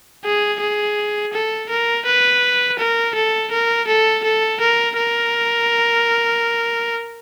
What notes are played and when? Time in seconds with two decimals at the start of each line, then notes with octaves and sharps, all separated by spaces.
0.25 G#4
0.60 G#4
1.33 A4
1.69 A#4
2.06 B4
2.79 A#4
3.15 A4
3.51 A#4
3.87 A4
4.24 A4
4.60 A#4
4.97 A#4